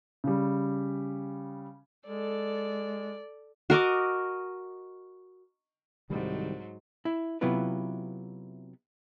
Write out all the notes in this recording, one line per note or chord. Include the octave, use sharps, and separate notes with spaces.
C#3 G3
G#3 A4 D5
F#4 A#4 D#5 D6
C2 G#2 D#3 F#3 G3
E4
C3 F#3 B3 E4 F4 B4